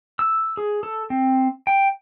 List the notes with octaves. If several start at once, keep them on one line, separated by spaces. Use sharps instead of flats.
E6
G#4
A4
C4
G5